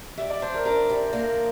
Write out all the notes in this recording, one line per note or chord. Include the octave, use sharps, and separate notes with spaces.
G3 E5
D5
D4 C5
A#4
D4 A#4
G3
A#3